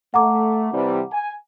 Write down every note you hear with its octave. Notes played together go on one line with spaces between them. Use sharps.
A3 F#5 A#5 D6
C3 E3 G3
G#5